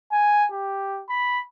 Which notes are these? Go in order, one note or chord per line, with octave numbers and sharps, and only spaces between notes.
G#5
G4
B5